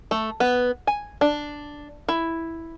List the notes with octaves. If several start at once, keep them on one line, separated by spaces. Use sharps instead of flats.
A3
B3
G#5
D4
E4